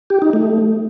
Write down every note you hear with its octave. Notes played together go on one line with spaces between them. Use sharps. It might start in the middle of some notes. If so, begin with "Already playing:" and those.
G4
D#4
A3